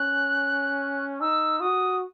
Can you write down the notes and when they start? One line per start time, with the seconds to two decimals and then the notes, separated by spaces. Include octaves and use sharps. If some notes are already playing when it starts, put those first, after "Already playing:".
Already playing: C#4 F#6
1.21 D#4 E6
1.60 F#4 D#6